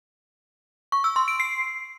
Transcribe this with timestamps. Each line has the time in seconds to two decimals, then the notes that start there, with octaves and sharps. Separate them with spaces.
0.92 C#6
1.04 E6
1.16 C6
1.28 D7
1.40 C7